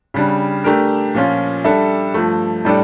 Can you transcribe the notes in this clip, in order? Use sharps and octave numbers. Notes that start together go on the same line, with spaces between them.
C#3 G3 D4
A3 D4 G4 A#4
A#2 F3 C#4 F4
G3 D4 A4 E5
G2 F3 A3
A2 G3 D4 A4 D5